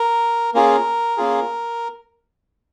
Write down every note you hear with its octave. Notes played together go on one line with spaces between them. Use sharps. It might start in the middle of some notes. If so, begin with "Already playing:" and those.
Already playing: A#4
A#3 C#4 F4 G#4 A#4
A#3 C#4 F4 G#4